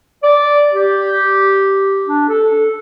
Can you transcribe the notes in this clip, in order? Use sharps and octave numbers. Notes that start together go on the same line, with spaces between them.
D5
G4
D4
A4